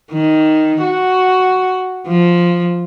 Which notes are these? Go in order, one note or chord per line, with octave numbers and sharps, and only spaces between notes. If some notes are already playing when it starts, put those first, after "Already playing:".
D#3
F#4
F3